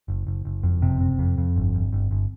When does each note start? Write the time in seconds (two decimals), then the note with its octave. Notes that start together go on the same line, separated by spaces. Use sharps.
0.08 F#1
0.27 F#1
0.45 F#1
0.63 F2
0.82 F#1 C3 C4
1.00 C3
1.19 F2
1.38 F2
1.56 G1
1.74 G1
1.93 G1
2.11 G1